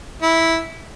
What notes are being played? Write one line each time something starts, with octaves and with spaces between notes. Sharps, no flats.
E4